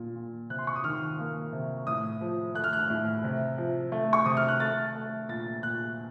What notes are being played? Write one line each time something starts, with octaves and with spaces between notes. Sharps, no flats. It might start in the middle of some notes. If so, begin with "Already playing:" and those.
Already playing: A#2
A#2
C3 F#6
C6
C#6
D#6
D#3 F6
A#3
C3
A2 D#6
F3
A3 F#6
F6
F#6
A2
C3
F3
A3
C#6
C3 D#6
F6
F#6
A3 A6
A3
A#2 A6
A#2 F#6